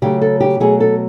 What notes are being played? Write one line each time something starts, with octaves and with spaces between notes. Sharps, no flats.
C#3 F#3 A3 G4
A4
G4
B2 F#3 A3 G#4
A4